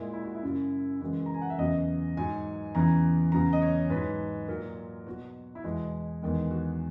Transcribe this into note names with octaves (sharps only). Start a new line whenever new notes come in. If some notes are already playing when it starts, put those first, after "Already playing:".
Already playing: A#2 G#3 E4
E4
F#4
E4
F#2 C#3 F#3
F#2 C#3 E3 G#3 F#4
A#5
G#5
F#5
E5
E2 C#3 F#3 D#5
G#2 F#3 G#5
E2 C#3 E3 A#5
E2 C#3 F#3 A#5
D#5
C#5
G#2 F#3 B4
A#2 F#3 A#4
B2 F#3 F#4
E4
E2 B2 G#3 F#4
E2 D#3 G#3
F#4